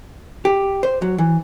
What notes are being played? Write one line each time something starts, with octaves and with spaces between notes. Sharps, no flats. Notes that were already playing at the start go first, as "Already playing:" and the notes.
G4
C5
F#3
E3